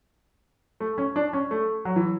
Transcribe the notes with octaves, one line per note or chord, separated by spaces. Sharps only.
A3
C#4
D4
C#4
A3
F#3
E3